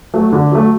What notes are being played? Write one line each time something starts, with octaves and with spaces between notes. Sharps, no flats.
F#3 A3
D3
F#3 A3